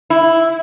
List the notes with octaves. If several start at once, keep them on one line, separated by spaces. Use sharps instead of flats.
E4